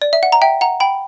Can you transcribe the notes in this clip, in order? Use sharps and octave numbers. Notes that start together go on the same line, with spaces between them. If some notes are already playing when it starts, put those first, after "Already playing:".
D5
E5
F#5
A#5
E5 G5
F#5 A#5
G5 B5